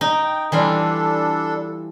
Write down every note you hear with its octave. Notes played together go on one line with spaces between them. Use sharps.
D#4 G5
E3 G3 D4 F4 A4